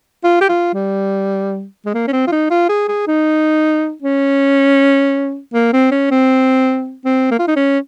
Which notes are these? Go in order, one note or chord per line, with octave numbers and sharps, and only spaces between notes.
F4
G4
F4
G3
G#3
A#3
C#4
C4
F4
D#4
F4
G#4
G#4
D#4
C#4
A#3
C4
C#4
C4
C4
A#3
F4
D#4
C#4